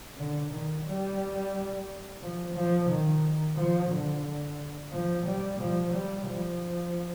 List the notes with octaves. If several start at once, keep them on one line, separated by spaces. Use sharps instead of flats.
D3
D#3
G3
F3
F3
D#3
F3
D3
F3
G3
F3
G3
F3